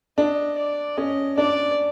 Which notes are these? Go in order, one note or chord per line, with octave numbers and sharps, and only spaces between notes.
D4 D#5
D5
C#4 D#5
D4 D5